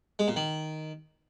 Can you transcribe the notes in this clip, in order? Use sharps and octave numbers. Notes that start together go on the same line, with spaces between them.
G#3
A#2
D#3